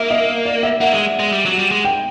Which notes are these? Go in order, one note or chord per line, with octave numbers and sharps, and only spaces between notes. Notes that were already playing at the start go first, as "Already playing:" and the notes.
Already playing: A#3 E5
D#5
D5
E5
A#3 F#5
G#3
G#3
G3
F#3
G3
G#3
G5